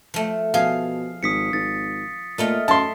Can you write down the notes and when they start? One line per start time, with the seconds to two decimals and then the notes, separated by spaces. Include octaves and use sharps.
0.14 F3 A3
0.54 B2 F3 G#4 F5
1.23 G#1 D#6 B6 C#7
1.53 G#1 A6
2.38 A#2 A3 D#4 F4
2.68 F#2 E4 A5 C6